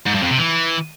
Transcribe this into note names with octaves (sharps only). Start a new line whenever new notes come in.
G#2
G2
F2
C3
E3